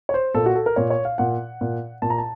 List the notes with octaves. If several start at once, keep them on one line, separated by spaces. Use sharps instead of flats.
C#5
C5
A#2 A4
F#4
A4
A#4
A#2 C#5
C#5
F5
A#2 F#5
A#2
A#2 A5
A#5
A5